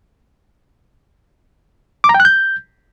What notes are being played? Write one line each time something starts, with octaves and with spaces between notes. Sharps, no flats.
D6
A#5
G5
F#6
G6